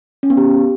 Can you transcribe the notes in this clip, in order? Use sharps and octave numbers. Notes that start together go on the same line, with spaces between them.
C#4
B3
G4